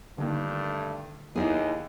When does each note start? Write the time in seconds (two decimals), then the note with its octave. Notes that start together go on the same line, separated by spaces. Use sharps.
0.18 G2 D3 D#3 A3 A#3
1.36 D#2 B3 D#4 E4 G#4